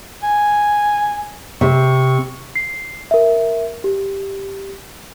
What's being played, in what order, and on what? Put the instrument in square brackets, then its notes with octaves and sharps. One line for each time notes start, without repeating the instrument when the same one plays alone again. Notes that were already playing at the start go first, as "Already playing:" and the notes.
[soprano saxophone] G#5
[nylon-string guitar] C3 [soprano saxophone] C#6
[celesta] C7
A#4 E5
G4